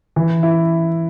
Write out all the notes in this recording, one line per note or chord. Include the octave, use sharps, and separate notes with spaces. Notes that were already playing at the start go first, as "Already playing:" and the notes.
E3
E4